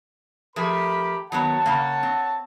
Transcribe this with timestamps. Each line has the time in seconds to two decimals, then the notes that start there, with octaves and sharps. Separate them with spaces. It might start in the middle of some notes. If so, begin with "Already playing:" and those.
0.56 F3 A3 G4 G#4 A#4 B5
1.32 D#3 F#3 B3 C#5 F#5 A5
1.66 C#3 A#3
2.03 C4